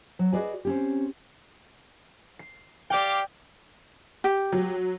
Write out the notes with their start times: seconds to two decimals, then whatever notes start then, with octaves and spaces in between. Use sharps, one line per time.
0.19 F#3
0.32 F#4 G#4 B4 D5 D#5 G#5
0.65 C4 C#4 G4
2.39 C7
2.90 G4 D5 F5 G5 D6
4.24 G4
4.52 F#3